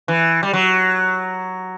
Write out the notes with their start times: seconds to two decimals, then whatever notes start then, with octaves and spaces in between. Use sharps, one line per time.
0.08 E3
0.43 G3
0.53 F#3